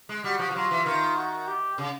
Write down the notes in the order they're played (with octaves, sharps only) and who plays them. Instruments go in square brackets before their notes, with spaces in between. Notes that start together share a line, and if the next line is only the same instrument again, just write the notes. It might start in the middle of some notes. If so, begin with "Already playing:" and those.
[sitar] G#3
[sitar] G3 [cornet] F#4
[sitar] F3
F3
[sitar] F#3 [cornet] F4
[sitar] E3
[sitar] D#3 [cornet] F4
[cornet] F#4
G4
[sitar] C#3